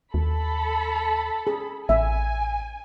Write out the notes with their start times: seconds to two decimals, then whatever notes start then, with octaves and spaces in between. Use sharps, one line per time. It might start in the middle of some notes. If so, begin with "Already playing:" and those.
0.14 D#2 A4 B5
1.47 G#4
1.89 A1 E5 G#5